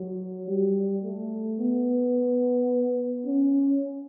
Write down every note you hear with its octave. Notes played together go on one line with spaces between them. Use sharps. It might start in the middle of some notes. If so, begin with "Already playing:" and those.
Already playing: F#3
G3
A3
B3
C#4